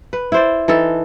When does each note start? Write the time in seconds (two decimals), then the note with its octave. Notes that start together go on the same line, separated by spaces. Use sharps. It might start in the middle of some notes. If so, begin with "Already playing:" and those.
0.13 B4
0.32 E4 C5 D5
0.68 E3 D#4 A4